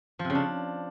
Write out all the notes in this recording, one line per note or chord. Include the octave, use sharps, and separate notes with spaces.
F3
C3
C#3
D4